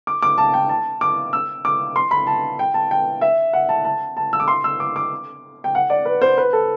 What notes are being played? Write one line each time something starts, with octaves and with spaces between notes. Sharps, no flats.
D6
D6
A5
G5
A5
D6
E6
D6
C6
B5
A5
G5
A5
G5
E5
F#5
A5
A5
A5
E6
D6
C6
E6
D6
D6
G5
F#5
D5
B4
C5
B4
A4